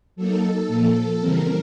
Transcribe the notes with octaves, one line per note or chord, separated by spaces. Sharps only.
F#3 A#3 D#4 A4
A#2 F3 A#3
C#3 E3 G3 C4 A#4